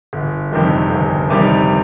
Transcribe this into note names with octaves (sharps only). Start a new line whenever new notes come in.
G1
F2 C3 D#3 G3
G1
F2 C3 D#3 G3